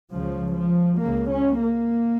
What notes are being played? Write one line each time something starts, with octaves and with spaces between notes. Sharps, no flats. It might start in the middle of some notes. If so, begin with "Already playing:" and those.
C#2 C#3 F3
F3
C#2 C#3 A#3
C#4
A#3